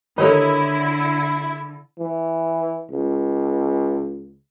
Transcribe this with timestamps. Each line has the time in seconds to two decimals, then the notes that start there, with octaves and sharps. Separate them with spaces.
0.18 D3 D#3 E4 G4 A4 A#4 C#5 D#5
1.99 E3
2.91 C#2